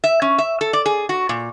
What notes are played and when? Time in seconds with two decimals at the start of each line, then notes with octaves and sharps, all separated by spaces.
0.04 E5
0.22 C#4
0.38 E5
0.61 A4
0.73 D5
0.86 G#4
1.09 F#4
1.29 A#2